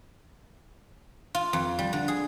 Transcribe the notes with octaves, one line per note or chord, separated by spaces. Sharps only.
F4
F2
G3
D3
G#4